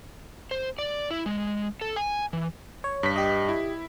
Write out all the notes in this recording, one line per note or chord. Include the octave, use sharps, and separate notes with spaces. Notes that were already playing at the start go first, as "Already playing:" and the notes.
C5
D5
E4
G#3
A4
G#5
E3
C#5
G2 B6
G4 D#5
E4